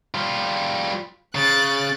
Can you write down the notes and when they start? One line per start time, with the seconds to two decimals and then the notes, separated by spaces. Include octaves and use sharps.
0.15 G3 F4
1.35 C#3 F#6 A6